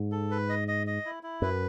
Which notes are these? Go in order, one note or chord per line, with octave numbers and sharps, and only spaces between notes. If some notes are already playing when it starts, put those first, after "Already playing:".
Already playing: G#2
A4
B4
D#5
D#5
D#5
E4
E4
F#2 B4